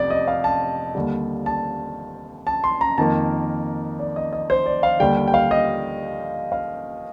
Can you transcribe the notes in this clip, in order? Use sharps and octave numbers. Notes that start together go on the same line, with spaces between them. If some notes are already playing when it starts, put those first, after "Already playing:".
Already playing: F1 F2 C3 D5
D#5
F5
A5
D#2 D3 G3
A5
A5
C6
A#5
F2 D#3 A#3 A5
D5
D#5
D#5
C5
D5
F5
D#2 D3 G3 G5
G5
G5
F5
D#5
F5